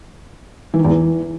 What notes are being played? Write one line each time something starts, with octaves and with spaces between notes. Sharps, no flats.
E3
D#3
E2
E3